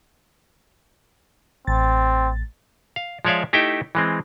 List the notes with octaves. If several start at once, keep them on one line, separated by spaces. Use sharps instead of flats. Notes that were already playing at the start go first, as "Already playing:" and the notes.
A1 C4 A6
F5
F3 G#3 C#5 D5 E5 F5
A3 D#4 E4 G4 E5 G5
E3 G#3 C4